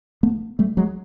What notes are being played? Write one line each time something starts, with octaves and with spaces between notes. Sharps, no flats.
A3 B3
G3 A3
F#3 G#3